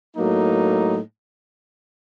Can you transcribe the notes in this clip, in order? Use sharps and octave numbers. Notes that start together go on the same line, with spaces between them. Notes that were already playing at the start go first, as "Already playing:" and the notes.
A2 F#3 A#3 D#4